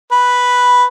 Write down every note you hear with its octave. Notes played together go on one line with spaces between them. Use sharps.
B4